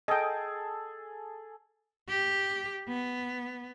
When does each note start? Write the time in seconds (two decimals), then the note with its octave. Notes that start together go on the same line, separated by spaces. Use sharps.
0.08 G#4 A4 D#5 G5
2.09 G4
2.88 B3